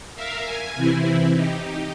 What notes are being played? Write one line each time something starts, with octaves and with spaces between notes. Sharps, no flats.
A#4 E5 F5
G#5
C3 E3 C4 E4
D#4 G4